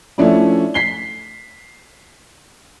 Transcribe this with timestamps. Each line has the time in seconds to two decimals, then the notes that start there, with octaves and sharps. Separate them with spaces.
0.18 F3 A3 C#4 D4 E4
0.74 B6 C7 G7